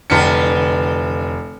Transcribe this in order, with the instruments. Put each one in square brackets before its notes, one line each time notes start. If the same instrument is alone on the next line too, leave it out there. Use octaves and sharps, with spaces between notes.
[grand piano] F1 C#7 [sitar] D3 E3 B4